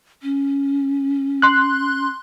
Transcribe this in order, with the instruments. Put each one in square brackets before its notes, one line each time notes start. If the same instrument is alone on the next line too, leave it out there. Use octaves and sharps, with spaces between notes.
[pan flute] C#4
[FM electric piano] C6 F#6